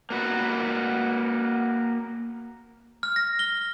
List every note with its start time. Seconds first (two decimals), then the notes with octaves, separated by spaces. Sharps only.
0.10 A#3 F#4 B4
3.03 F6
3.16 A#6
3.39 G7